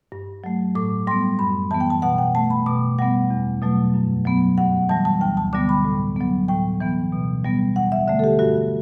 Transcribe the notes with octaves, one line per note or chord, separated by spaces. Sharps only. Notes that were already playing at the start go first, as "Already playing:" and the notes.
G2
F#3 A3
A2 D6
G3 B3 C6
F#2 B5
E3 B3 A5
G5
A5
B2 F#5
G5
A3 A5
B5
B2 D6
G3 B3 F#5
E2
B2 F#3 A3
F#2
F#3 B3
G2 F#5
E3 G3 A5
A5
D2 G5
A5
D3 G3 B3 D6
B5
A2
F#3 B3
A2 G5
E3 B3
B2
G3 B3
E2 F#5
E5
D3 A3 E5
A4
G4
G2 F#4